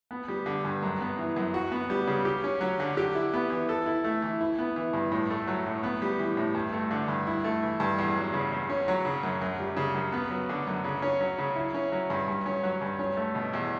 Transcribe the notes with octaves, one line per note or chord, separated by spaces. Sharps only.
B3
G3
D3
G2
F#2
B3
E3
F#2
F#4
B3
G3
C#3
G4
C#4
F#3
D3
G4
E4
B3
E3
A4
E4
A3
E3
E4
B3
E3
G2
A2
A3
F#3
A2
B3
G3
E3
A2
G2
A3
D3
G2
E4
A3
E3
G2
E2
F#3
C#3
E2
C#4
F#3
C#3
F#2
F#2
G3
C#3
F#2
B3
F#3
D3
F#2
C#3
C#4
F#3
C#3
E4
C#4
F#3
G2
G2
C#4
F#3
G2
C#4
A3
B2
E2